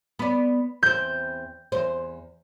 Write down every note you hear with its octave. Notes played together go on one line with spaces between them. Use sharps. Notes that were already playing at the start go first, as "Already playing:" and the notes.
B3 D5
E2 C4 G6
E2 C5